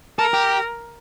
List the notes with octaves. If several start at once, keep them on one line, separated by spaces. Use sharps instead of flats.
A4 A#4
G4